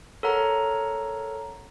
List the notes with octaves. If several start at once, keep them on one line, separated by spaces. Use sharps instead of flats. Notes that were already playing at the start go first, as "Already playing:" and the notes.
A4 A#4 C#5 F#5 A#5